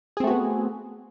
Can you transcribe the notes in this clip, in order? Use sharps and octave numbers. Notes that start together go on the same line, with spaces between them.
A3 B3 C4 F#4 G#4